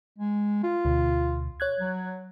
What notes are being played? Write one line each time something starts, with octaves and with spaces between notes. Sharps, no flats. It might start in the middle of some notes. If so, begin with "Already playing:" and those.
G#3
F4
D2 B2
C#5 F#6 G#6
F#3